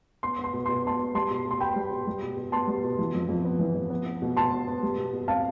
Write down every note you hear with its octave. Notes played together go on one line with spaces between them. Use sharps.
B3 C6
B3
C6
B2
B2 C6
B3 A5 C6
B3
G3 A5 C6
B2
B2
C6
B3 G5 B5
G3
B2
G3
B2
B2
B3 A5 C6
G3
B2
E3
F2
F2
B3
E3
F2
B3
B3
B2
B2 A5 C6
B3
B3
G3
B2
B2
C4 F5 A5